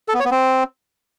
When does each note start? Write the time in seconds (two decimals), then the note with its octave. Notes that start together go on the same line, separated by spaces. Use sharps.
0.09 A4
0.14 B3
0.20 C#5
0.25 B3
0.31 C4